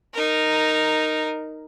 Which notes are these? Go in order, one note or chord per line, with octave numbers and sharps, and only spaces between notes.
D#4 A#4